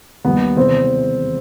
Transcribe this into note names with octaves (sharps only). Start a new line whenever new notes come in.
D#2 D#3 G3 B3
E1 E2 C3 E3 C4